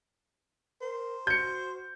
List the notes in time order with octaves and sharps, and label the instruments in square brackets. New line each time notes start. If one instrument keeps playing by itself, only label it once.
[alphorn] A#4 [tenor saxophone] C5
[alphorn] F#4 [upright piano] G6 C#7